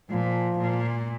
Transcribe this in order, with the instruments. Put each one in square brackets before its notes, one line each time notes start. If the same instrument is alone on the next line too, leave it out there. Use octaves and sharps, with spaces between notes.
[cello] A#2 [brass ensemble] F3
[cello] A#2